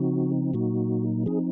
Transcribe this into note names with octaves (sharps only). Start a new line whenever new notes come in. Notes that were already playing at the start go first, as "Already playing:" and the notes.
Already playing: C#3 F3 C4 D#4 F#4
A#2 F#3 A#3 D#4 F#4
F3 C4 D#4 G#4